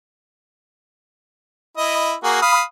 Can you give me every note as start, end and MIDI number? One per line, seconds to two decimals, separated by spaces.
1.77 2.14 64
1.77 2.14 75
2.24 2.40 58
2.24 2.40 66
2.24 2.40 68
2.42 2.62 77
2.42 2.62 83
2.42 2.62 87